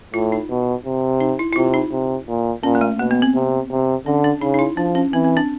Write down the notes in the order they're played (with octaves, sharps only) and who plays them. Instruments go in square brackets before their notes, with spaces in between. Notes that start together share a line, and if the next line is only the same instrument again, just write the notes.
[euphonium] A2 [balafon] F4
[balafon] D#4
[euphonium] B2
C3
[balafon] D#4
E4
E4
[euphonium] C3 [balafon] F4
[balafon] D#4
[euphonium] C3
A#2
[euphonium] A#2 [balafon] C#4
[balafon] A#3
A3
[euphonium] B2 [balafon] A#3
[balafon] B3
C4
[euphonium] C3
C3
[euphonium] D3 [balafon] C#4
[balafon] D4
[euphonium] C#3 [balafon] D#4
[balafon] D#4
E4
[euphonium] F3 [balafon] D4
[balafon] C#4
[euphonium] E3 [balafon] C4
[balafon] C4
D4